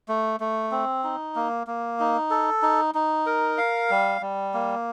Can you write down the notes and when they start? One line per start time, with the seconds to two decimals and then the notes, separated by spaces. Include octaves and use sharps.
0.08 A3
0.40 A3
0.71 C4
1.04 D#4
1.36 A#3
1.67 A#3
2.00 D#4
2.30 A4
2.62 D#4
2.95 D#4
3.26 A#4
3.58 F5
3.90 G3
4.21 G3
4.54 A#3